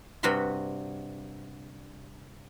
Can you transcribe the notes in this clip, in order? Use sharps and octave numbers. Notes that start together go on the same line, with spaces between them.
G2 C3 F#4 B5 C6